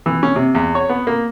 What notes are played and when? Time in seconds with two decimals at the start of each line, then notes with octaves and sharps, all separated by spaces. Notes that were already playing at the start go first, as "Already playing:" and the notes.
0.06 E3
0.23 C#4
0.36 C3
0.55 E2
0.75 C#5
0.89 B3
1.07 A#3